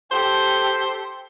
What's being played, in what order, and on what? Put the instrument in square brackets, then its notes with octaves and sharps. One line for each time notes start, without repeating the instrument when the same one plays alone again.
[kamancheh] G4 A4 [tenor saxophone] C5